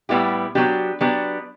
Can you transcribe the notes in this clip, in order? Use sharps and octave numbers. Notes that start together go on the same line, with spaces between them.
A2 G3 B3 E4 G4
F#3 B3 D4 G4
F#3 B3 D4 G4